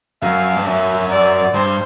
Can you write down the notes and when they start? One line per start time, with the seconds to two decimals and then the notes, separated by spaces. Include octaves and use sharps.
0.22 F#2 F5
0.57 G2
0.66 F#2 E5
1.11 D5
1.54 G2 C5